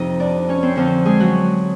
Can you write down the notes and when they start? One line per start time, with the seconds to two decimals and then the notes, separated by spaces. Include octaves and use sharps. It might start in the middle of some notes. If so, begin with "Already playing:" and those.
Already playing: F2 C3 F3 D#4 D#5
0.19 D4 D5
0.49 C#4 C#5
0.63 C4 C5
0.76 F2 D3 F3 C4 C5
1.05 G#3 G#4
1.20 F#3 F#4